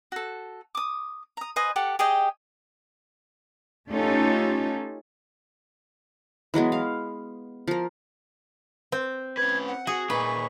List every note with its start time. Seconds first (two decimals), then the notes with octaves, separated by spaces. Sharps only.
0.12 F#4 A4
0.75 D6 D#6
1.37 A#5 D#6
1.56 B4 C5 D#5 G#5
1.76 G4 A4 F#5
1.99 G4 G#4 D#5 G5
3.90 A3 C#4 D#4 F4 G4 A4
6.54 E3 F#3 G#3 B3
6.72 F5
7.68 F3 A#4
8.92 C4
9.38 C#4 B4 G#6
9.67 F#5
9.87 F#4 G#4
10.10 A#2 D#4 B4 C#6